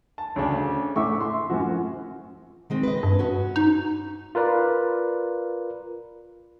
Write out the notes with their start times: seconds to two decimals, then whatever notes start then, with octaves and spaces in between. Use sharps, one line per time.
0.18 A5
0.36 D2 C#3 C#4 D4
0.96 A2 E5 C#6 D6
1.20 C6
1.50 F#2 A2 F3 F#4
2.70 D#3 G#3 C4
2.83 B4 D#5
3.03 G2
3.19 C#4 F#4
3.56 C#4 D#4
4.35 F4 A#4 B4 D5